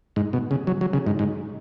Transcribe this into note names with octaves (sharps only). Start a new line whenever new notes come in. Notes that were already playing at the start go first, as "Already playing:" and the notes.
G#2
B2
C#3
F#3
F#3
C#3
G#2
G#2